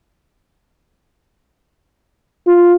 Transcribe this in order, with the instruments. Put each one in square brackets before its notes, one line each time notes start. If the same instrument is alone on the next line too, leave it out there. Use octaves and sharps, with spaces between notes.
[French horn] F4